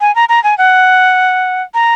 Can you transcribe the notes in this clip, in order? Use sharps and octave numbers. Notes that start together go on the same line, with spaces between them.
G#5
A#5
A#5
G#5
F#5
A#5